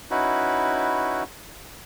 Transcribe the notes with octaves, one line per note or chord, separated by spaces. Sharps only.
C#4 D#4 E4 F#4 B4